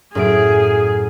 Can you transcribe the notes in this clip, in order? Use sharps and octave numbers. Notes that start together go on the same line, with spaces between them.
F#2 A2 G#4 D7